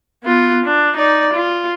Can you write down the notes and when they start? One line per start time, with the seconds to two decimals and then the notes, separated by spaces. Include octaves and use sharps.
0.24 B3 F4
0.65 D4
0.96 D#4 D5
1.33 F4